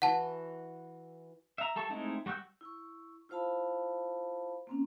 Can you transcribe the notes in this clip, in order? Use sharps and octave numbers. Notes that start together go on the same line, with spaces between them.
E3 F#4 F#5 A5
E5 A#5
G3 A4 A5 C#6
G#3 A3 C4 D#4 E4
G3 F#4 C#6 E6 G6
E4 C#6
E4 F4 C5 F5 A5 B5
A#3 C4 C#4